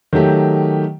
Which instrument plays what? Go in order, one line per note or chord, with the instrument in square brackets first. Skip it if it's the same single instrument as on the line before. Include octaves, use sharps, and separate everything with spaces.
[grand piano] D#3 F#3 A3 G4